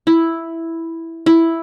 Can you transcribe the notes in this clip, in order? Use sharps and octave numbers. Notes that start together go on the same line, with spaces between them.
E4
E4